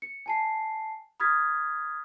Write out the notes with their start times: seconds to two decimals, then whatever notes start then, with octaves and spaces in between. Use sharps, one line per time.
0.02 C#7
0.26 G#5 A5 C7
1.20 B5 D#6 F6 G#6 A6 B6